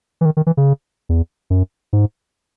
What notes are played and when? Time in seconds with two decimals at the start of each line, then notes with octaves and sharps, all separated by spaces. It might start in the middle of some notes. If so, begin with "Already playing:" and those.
0.21 E3
0.25 D#3
0.37 D#3
0.47 E3
0.57 C#3
1.09 E2
1.50 F#2
1.93 G#2